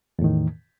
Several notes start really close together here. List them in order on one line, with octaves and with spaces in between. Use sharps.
E2 A2 D#3